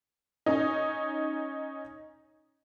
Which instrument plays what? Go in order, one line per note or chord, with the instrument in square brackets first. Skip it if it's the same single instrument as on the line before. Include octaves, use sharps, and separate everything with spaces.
[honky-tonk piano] C#4 D#4